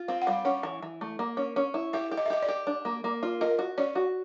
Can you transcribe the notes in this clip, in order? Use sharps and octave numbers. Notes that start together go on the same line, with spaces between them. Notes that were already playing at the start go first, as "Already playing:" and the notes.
Already playing: F4
C4 F5
F#5
G3 F5
C#4 F#5
E3
E3
A3
A#3
C#4
C#4
E4
G4 E5
G4
D#5
E5
G4 D#5
D5
G4
D4
A#3
A#3
F4
A#4 D#5
F#4
C#4 D5
F#4